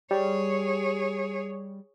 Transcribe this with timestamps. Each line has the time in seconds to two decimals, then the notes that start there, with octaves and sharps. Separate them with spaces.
0.11 G3 G#4 C#5